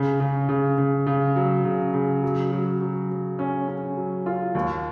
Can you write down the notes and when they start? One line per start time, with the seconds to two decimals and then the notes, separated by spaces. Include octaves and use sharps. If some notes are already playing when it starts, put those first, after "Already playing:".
Already playing: C#3
0.20 C#3
0.49 C#3
0.78 C#3
1.07 C#3
1.36 F#3
1.65 C#3
1.94 C#3
2.23 F#3
2.52 F#3
2.81 F#3
3.10 F#3
3.39 C#4
3.68 C#4
3.97 F#3
4.26 F4
4.55 D#2